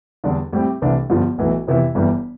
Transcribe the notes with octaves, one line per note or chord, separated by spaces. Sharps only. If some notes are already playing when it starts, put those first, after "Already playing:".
E2 D3 G3 D4
A2 G3 C4 G4
C2 C3 E3 A3 D4
G1 G2 D3 F3
B1 A2 E3
F2 C3 E3 B3 E4
G1 G2 E3 G3